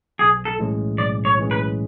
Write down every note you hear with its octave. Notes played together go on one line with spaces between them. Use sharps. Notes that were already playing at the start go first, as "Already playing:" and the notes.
B1 G#4
A4
A2 E3 G#3 C#4
B1 D5
C#5
A2 E3 G#3 C#4
B4